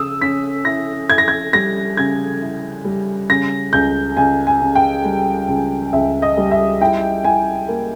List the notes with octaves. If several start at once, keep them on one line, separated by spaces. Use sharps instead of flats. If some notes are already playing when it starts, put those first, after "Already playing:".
Already playing: C#3 D#6 E6
C#4 B6
E4 A#6
E4 G#6
A#6
G#6
G3 A#6
C#3 G#6
E4
G3
C#3 A#6
C#2 G6
C#2 G#5
G#5
C#3
G5
G3
C#2
C#2 E5
D#5
G3
E5
E4 G5
E4 G#5
A#3